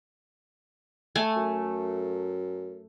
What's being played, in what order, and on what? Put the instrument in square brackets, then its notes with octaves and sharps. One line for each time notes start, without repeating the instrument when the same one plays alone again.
[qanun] A3 G#5
[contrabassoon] F#2